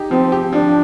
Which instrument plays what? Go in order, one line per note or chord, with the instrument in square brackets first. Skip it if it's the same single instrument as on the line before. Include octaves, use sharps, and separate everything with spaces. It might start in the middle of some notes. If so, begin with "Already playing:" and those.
Already playing: [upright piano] D#4 G4
[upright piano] F3 [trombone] C4
[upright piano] G4
[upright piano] F3 [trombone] D4